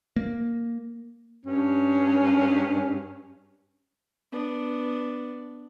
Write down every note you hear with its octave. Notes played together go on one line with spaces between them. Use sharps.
A#3
G2 C#4
B3 D4